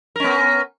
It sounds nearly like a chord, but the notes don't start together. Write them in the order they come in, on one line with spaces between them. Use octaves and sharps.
A#4 C#4 B3